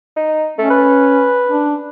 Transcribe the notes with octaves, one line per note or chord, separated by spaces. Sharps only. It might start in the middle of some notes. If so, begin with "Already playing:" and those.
D#4
A3 C#4
B4
D4